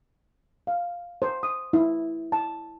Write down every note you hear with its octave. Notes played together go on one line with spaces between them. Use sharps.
F5
C5
D#6
E4
A5